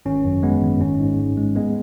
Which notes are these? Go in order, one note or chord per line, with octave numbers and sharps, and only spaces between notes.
G#1 C#4
F#2
G#3 B3
G#1
G#2 C#4
G#2
G#1
G#3
G#3 B3